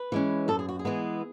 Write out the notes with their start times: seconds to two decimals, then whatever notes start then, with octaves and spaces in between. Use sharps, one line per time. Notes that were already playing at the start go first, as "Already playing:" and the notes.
Already playing: B4
0.12 E3 G#3 C#4
0.48 F#2 A4
0.59 G#4
0.69 F#4
0.79 G#4
0.85 E3 G#3 B3